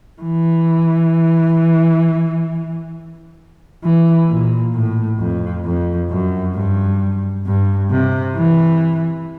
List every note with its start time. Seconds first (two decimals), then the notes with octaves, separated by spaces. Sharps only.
0.22 E3
3.84 E3
4.29 A#2
4.74 A2
5.19 F2
5.65 F2
6.10 F#2
6.55 G2
7.46 G2
7.91 C3
8.36 E3